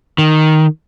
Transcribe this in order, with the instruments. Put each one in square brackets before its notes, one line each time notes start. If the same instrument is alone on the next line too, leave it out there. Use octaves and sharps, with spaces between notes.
[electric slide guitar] D#3